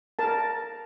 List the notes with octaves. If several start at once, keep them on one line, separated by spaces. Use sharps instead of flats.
A#4 A5